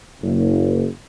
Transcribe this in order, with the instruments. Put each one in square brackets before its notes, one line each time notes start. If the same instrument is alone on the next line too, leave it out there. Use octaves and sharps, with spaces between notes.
[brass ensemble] F#1